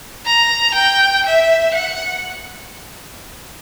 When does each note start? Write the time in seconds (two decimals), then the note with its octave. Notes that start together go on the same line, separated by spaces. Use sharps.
0.26 A#5
0.75 G5
1.26 E5
1.75 F#5